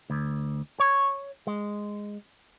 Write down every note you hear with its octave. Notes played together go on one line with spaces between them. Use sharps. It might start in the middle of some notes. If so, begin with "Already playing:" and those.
D2
C#5
G#3